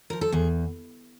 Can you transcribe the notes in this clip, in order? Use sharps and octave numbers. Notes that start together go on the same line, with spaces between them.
F3 A#4
A4
E2 G#4